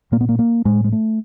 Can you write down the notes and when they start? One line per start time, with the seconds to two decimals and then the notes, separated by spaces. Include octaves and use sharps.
0.12 A#2 A#3
0.21 B3
0.29 A#3
0.39 A#3
0.65 A2 G#3
0.84 G#3
0.92 A3